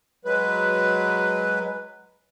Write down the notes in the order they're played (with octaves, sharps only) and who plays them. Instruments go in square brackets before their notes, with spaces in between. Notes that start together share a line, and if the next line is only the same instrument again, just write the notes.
[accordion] F#3 G#3 B4